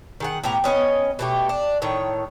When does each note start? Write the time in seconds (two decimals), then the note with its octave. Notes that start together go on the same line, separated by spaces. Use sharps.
0.20 D#3 G#4 F#5
0.43 A2 B3 G4 A#5
0.64 B3 C#4 C#5 D#5
1.19 B2 A3 G4
1.49 D4
1.82 A2 D#3 C#5